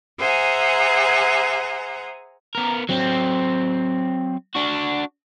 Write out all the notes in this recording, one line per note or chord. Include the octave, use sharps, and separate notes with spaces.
G#4 C5 E5 F#5 G#5 A#5
B3 A#4
F#3 C4
D4 F#4